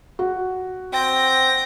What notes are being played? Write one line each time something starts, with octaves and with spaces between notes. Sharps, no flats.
F#4
C4 G5 A#6